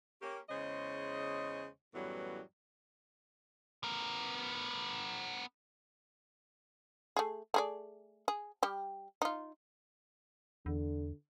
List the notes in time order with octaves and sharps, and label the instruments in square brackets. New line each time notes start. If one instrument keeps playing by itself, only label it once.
[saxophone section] A#3 C#4 G4
E2 C#3 G#3 C5 C#5 D#5
F#2 A2 E3 F#3 G3 B3
[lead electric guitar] B3 A#4
[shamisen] A3 G#4
A3 G#4 D5
G#4
G3 G4
D#4 F4
[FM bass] E2 [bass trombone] D3